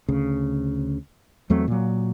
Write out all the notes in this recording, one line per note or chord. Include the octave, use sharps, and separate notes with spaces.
D2 C#3
E2 F#3 A3 C4
A#2 F#3